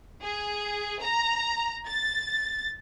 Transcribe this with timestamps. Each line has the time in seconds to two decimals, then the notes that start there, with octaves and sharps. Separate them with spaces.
0.21 G#4
1.01 A#5
1.86 A6